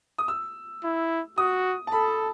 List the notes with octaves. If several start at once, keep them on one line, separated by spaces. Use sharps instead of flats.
D#6
E6
E4
F#4 D#6
A5
A4 B5